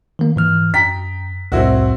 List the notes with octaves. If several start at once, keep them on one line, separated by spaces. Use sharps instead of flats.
D#3 A#3
G#2 E3 F6
F#2 G5 A#5 B6
C2 F2 A2 C4 E4 F#4